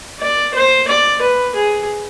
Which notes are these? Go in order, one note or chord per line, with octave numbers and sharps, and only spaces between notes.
D5
C5
D5
B4
G#4